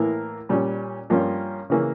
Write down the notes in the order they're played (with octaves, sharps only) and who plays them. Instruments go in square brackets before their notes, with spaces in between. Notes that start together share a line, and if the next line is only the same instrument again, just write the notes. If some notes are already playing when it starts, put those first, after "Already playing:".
Already playing: [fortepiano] A2 E3 A#3 E4 A#4
A#2 G3 C#4
G2 F3 A#3 C#4 F4
C#3 E3 A#3 C#4